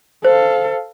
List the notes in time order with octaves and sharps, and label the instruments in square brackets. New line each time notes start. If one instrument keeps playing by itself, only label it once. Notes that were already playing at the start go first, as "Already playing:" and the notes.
[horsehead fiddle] A4 F5 [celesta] C5